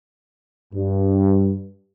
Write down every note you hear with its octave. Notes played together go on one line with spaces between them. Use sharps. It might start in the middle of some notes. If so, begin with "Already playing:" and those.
G2